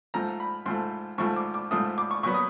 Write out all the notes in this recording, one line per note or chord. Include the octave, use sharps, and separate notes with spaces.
G#2 F3 A3 A#5
B5
G#2 F3 A3 C6
G#2 F3 A3 C#6
D6
D6
G#2 F3 A3 D#6
D6
C#6
A#2 F#3 B3 C#6
D#6